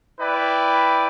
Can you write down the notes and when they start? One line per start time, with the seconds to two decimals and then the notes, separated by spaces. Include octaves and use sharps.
0.19 E4 B4 D5 G5